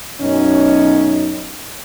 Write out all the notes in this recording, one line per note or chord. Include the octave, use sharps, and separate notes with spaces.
F#2 B2 C#4 D#4